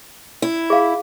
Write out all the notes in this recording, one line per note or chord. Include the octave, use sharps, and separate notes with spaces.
E4
G#4 F5